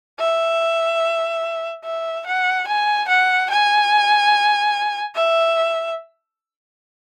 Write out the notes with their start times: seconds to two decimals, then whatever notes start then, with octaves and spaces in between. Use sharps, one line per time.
0.19 E5
1.84 E5
2.26 F#5
2.67 G#5
3.08 F#5
3.50 G#5
5.16 E5